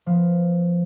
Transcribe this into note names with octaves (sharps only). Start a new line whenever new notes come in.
F3 B3